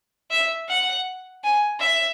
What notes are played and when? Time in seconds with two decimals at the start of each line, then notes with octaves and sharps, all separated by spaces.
0.31 E5
0.69 F#5
1.44 G#5
1.80 E5